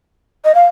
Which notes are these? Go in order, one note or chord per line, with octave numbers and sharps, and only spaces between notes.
D#5
F5